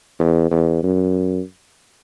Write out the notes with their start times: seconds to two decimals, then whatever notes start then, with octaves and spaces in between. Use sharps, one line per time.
0.19 E2
0.51 E2
0.83 F#2